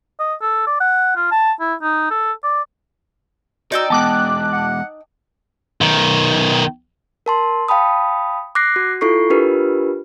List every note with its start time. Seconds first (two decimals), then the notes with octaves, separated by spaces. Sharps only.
0.20 D#5
0.41 A4
0.67 D5
0.81 F#5
1.16 F4
1.32 A5
1.60 E4
1.82 D#4
2.11 A4
2.44 D5
3.72 D#4 F#4 D5 G5 E6
3.90 E2 G#3 B3 A5 D6 F#6
4.53 F#5
5.81 B1 D#3
7.26 A#4 A5 C6
7.68 F5 G5 A5 B5 D#6
8.55 D6 F#6 A#6 C7
8.76 F#4
9.01 E4 F4 A4 C#6 C7
9.30 D4 F4 G4 A#4 B4